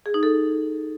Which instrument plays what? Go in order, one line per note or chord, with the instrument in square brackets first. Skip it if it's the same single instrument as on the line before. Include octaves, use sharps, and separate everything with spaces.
[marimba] G#4
D#4
A4